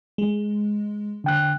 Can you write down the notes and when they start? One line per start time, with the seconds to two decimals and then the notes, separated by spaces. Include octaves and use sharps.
0.18 G#3
1.24 D3 G5 F#6